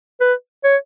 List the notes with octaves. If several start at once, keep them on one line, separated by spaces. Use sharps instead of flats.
B4
C#5